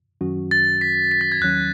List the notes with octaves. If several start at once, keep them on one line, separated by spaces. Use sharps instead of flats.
F#2 D#3 F#3 C#4 F#4
A6
B6
B6
A6
G#6
D#2 D#3 F#3 C#4 F#6